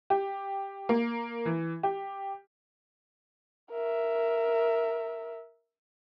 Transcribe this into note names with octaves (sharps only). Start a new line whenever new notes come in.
G4
A#3
E3
G4
A#4 E5